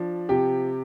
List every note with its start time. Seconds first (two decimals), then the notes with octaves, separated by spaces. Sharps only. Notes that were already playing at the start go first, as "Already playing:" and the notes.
Already playing: F3 D4
0.29 C3 G4